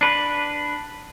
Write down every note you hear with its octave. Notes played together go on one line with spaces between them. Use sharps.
D4 B4